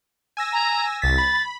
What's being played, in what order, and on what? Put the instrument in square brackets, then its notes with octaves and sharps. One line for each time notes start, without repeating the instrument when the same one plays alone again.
[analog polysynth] G#5 E6 A#6
[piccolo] A#5
[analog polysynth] C2 B6 [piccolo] A6
[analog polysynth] B5